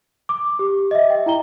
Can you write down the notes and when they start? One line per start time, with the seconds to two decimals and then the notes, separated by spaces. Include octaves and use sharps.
0.29 D6
0.59 G4
0.91 D#5 E5
1.10 G5
1.26 E4 G5 A#5 G7